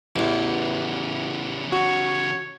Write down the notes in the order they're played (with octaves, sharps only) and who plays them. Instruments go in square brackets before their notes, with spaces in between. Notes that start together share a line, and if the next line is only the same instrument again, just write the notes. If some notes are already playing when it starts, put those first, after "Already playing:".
[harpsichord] A1 E2 [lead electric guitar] C#3 E3
[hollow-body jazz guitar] F#4 [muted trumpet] C#5